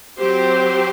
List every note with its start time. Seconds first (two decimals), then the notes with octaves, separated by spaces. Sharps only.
0.18 F#3 C4 G4 C5